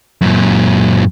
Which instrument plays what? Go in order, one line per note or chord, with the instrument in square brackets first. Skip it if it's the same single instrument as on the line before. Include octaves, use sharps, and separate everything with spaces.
[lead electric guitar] F#2 A#2